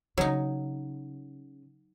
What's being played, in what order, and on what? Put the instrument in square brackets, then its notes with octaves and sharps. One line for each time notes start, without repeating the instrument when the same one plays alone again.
[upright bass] C#3 [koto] F#3 D#4